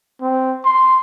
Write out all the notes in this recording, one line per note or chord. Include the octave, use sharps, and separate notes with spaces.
C4
C6